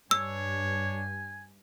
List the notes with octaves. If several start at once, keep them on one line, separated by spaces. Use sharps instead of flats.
G2 D4 C#5 G#5 E6